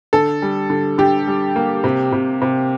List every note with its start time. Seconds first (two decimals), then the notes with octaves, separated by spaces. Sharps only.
0.13 D3 A4
0.42 G3
0.70 D3
0.98 D3 G4
1.27 G3
1.56 A#3
1.84 C3
2.12 C3
2.42 C3